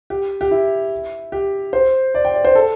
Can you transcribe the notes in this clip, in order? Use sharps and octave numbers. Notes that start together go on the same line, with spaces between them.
G4
G4
E4
G4
C5
D5
G5
D5
C5
A4